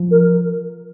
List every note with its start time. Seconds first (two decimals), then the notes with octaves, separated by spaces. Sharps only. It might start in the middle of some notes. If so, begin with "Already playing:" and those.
Already playing: F3
0.11 A#4